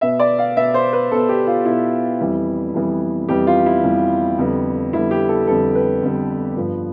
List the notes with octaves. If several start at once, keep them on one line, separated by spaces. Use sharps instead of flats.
B2 B3 E5
D5
F5
B2 B3 E5
C5
B4
B2 B3 A4
G4
F4
B2 B3 E4
F2 E3 G3 B3
F2 E3 G3 B3
F2 E3 G3 B3 G4
F4
E4
F2 E3 G3 B3
F2 D3 G3 B3
F2 D3 G3 B3 E4
G4
A4
F2 D3 G3 B3 A4
B4
F2 D3 G3 B3
G2 F3 B3